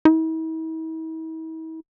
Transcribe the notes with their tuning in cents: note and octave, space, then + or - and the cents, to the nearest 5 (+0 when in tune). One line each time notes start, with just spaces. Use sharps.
E4 -45